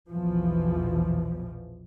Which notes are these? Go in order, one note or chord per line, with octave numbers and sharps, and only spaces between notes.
A#1 E2 B2 E3 F3